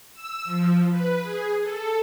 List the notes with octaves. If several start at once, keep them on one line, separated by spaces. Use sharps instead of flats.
E6
F3
B4
G#4
A4